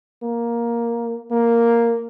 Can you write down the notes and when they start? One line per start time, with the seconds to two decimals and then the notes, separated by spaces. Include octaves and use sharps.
0.23 A#3
1.31 A#3